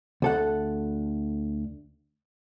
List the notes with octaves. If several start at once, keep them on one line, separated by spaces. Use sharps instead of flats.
D2 A4 F#5